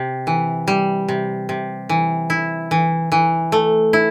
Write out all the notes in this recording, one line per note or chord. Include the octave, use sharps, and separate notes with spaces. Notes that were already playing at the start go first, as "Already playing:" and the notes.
Already playing: C3
E3
G3
C3
C3
E3
E4
E3
E3
A3
E4